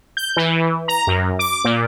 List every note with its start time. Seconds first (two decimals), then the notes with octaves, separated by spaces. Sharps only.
0.17 G6
0.37 E3
0.88 A#5
1.07 F#2
1.39 D6
1.64 A#2